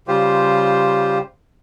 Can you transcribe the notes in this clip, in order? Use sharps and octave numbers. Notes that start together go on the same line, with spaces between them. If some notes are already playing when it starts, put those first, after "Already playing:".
C#3 G3 F4 G4 C5